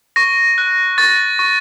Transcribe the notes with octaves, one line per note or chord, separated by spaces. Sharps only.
C#6 A#6
F#6
C#6 A6
C#6